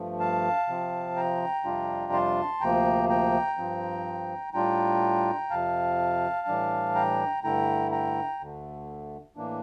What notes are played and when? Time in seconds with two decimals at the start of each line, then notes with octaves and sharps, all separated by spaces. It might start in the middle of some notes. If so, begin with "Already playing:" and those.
Already playing: G2 F3 A3
0.20 F5 A5
0.68 C3 F3 C4
1.16 G5 A#5
1.64 F2 C3 G3 D4 F4
2.13 A5 C6
2.61 D2 C3 F3 A#3 G5 A#5
3.09 G5 A#5
3.58 G2 F3 C4
4.53 A2 G3 D4 F4 G5 A#5
5.50 F2 C3 F3 F5 A5
6.47 A2 E3 G3 D4
6.95 G5 A#5
7.43 G2 D3 A3 E4 G5 A#5
7.92 G5 A#5
8.40 D2 D3 A3
9.36 A2 E3 A#3 D4